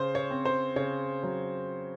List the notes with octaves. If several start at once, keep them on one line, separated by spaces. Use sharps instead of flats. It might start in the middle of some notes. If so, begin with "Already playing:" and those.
Already playing: C#3 C5
C#5
C4
C5
C#3 C#5
F#3